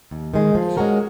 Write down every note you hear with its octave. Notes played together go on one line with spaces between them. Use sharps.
D#2
D#3 G#3
F3
G#3 C#4 F#4 A#4